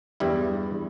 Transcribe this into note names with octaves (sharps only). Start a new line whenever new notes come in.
E2 G2 G3 E4